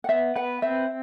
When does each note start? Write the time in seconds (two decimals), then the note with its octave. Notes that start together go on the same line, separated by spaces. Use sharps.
0.04 F#5
0.09 B3 E5
0.36 B4 F#5
0.62 C4 E5